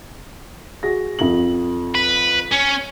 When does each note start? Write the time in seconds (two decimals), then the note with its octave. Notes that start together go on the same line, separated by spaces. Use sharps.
0.83 F#4 G#4 A#6
1.19 F2 F#7
1.95 B4
2.51 C#4